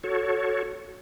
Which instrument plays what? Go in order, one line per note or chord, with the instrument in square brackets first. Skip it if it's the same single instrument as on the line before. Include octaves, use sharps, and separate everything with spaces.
[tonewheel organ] F#4 A4 C#5